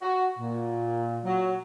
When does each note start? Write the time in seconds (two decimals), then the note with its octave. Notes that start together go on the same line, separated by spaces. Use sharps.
0.02 F#4
0.38 A#2
1.25 F#3